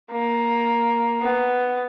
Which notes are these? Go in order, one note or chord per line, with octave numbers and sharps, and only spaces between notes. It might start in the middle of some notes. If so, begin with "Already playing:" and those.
A#3
B3